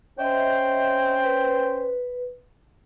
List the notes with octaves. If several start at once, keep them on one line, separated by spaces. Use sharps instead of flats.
C#4 C5 D#5 E5 G5
B4